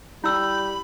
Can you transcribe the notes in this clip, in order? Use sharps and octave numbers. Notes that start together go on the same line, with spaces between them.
G3 E4 B5 E6 G6